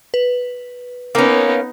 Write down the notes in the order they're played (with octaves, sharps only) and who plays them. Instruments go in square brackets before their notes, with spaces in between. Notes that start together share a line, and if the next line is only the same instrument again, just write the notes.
[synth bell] B4
[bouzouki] A#3 C#4 [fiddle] B3 D#4